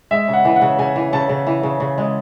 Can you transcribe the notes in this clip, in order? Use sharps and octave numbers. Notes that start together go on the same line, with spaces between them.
G#3 E5
C#3
F#5
E3
F#5
C#3
C#3 G#5
E3
C#3 A5
C#3
E3
C#3
C#3
G#3